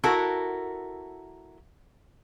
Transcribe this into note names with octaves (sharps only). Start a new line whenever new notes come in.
E4 F#4 A4 A#4